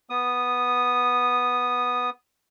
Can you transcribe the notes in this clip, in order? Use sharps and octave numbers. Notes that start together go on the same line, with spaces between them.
B3 D#6